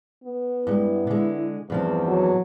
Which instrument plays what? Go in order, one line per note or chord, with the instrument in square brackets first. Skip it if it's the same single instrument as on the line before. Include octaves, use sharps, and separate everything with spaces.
[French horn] B3
[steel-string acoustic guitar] G2 G#3 [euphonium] E4
[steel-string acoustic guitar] D3 G#3
[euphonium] E2 [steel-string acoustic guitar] G2 F3 C4
[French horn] F#3